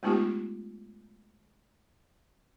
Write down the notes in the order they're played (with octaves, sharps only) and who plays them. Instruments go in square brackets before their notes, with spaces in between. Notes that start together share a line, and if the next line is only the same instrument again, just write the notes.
[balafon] G#3 A3 B3 D#4 F4 G4